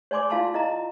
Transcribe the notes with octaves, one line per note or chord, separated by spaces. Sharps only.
C#5 D5 G#5 C6 D6
E4 F4 F5 A5 C6
E4 D#5 A#5